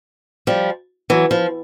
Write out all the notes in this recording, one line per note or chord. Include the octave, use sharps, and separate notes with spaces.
F3 G3
E3 F#3
F3